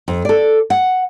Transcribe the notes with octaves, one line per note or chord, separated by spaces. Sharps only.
F2
A4 D5
F#5